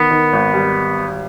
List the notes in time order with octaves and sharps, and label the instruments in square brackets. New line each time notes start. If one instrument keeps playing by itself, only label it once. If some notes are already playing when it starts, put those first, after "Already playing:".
Already playing: [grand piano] D#3 [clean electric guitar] B3
[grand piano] D#3
G#1
G3